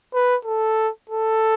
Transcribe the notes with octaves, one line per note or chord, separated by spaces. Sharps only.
B4
A4
A4